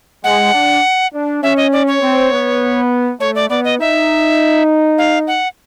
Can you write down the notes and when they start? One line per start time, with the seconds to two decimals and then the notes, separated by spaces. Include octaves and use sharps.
0.24 G#3 F#5
0.53 D4
1.13 D4
1.43 C#4 E5
1.57 D#5
1.72 D5
1.87 C#5
2.02 C4
2.32 B3
3.20 A3 C#5
3.35 D5
3.50 B3 D5
3.65 D#5
3.80 D#4 E5
4.98 F5
5.27 F#5